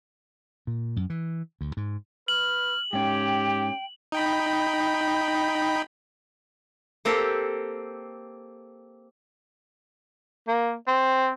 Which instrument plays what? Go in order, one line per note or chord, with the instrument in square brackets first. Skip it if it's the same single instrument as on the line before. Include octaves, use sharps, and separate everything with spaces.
[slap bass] A#2
F#2
E3
D2
G#2
[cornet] B4 [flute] F6 [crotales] F#7
[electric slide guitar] G#2 C#4 [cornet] G4 [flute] G5
[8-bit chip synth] D#4 G5 B5
[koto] A#3 C4 G4 A4
[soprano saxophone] A#3
C4